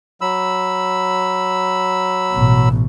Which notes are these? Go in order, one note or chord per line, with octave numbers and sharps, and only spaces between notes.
F#3 B5 E6
A1 B2